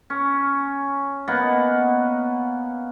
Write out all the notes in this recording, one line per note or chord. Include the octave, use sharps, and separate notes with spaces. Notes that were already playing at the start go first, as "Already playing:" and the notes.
C#4
A#3 B3 D#5 F#5